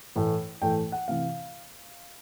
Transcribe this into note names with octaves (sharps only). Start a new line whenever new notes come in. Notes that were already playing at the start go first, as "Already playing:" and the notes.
A2 E3 A3
A2 E3 A3 G5
F#5
C3 E3 F5